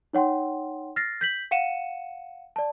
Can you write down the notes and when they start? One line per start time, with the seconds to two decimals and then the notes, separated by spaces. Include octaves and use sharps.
0.13 D#4 C#5 F#5 G5 C6
0.96 F6 A6 A#6 C7
1.21 G6 B6 F#7
1.51 F5 F#5 C#7 D#7 E7
2.56 D5 A5